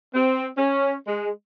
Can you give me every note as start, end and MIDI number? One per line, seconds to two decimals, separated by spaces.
0.15 0.46 60
0.57 0.95 61
1.07 1.30 56